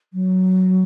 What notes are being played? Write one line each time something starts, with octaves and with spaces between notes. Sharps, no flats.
F#3